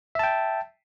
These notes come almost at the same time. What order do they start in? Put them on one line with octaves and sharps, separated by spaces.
E5 A5 G5